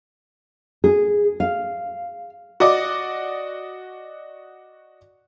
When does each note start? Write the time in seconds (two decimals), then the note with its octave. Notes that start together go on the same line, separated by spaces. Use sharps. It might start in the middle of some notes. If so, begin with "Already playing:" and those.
0.84 G#4
1.40 F5
2.60 F#4 D5 D#5 D6